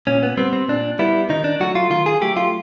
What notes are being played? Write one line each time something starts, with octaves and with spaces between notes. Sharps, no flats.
A#2 C#4
B3
G3 B3 C4
C4
A#2 D4
G3 B3 E4
D#3 D#4
D4
F#3 A3 F#4
F4
D#3 F4
G#4
F#3 A3 G4
F4